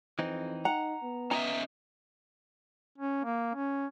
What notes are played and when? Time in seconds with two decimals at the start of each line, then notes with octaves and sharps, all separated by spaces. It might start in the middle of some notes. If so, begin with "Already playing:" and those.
0.19 F2 E3 C4 D#4
0.65 D#4 F#5 A#5
1.03 B3
1.31 C#4 D#5 E5 A#5
2.98 C#4
3.24 A#3
3.55 C#4